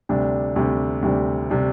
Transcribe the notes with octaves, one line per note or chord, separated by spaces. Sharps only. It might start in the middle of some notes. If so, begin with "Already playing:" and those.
D2 C3 G3 D4
D2 C3 G3 D4
D2 C3 G3 D4
C3 G3 D4